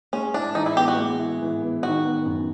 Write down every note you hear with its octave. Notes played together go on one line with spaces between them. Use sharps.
G#3 C#4
D4 E4
E3 D#4
E4
B3 G4
F#4
G#3
E4
E3
B3
D#3 F#4
B3
F#2